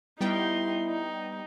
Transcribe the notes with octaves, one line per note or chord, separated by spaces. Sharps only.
G3 B3 D#4 E4 G5 C6
D#4